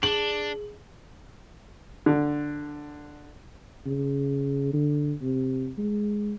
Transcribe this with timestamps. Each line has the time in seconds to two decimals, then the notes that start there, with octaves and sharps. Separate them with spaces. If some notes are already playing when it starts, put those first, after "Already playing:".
0.03 D4 G#4 F#7
2.06 D3
3.87 C#3
4.73 D3
5.22 C3
5.78 G#3